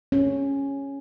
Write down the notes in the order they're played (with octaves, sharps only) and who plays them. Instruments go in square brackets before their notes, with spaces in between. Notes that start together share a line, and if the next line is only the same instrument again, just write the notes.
[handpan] C#4